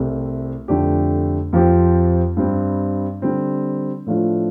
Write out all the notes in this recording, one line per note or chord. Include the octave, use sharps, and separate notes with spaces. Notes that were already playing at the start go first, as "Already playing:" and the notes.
Already playing: C2 C3 A3 C4
F2 D3 A3 D4 G4
F2 F3 C4 G4
G2 G3 C4
D3 G3 C4
A2 F3 A3 D4 F4